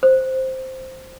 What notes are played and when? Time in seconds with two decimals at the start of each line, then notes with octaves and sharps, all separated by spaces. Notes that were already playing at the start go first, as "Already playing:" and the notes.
0.03 C5